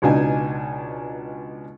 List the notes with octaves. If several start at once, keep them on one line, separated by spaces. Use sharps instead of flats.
C#2 B2 D4 D#4 G#5